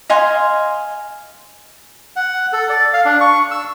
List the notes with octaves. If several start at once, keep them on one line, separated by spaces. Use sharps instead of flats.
D#5 F5 G#5 C6
F#5
A4
D5
F5
D4
C#6
E6